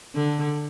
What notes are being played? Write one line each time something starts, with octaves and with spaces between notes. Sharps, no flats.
D3